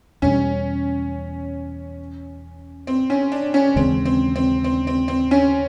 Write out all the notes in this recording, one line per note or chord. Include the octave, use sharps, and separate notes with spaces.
E2 B2 G3 C#4
C4
C#4
D4
C#4
D#2 C#3 E3 G#3 C4
C4
C4
C4
C4
C4
C#4